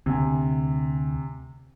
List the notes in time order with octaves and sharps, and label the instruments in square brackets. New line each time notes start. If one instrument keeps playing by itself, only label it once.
[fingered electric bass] D2 [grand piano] C3 G#5